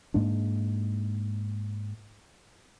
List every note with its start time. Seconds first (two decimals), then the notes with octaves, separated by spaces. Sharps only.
0.14 G#2 G#3 A#3 D4